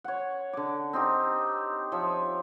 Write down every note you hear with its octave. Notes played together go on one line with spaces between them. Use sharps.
C#5 F#5
D3 D6
C4 D#4 G4
F3 C#5 E5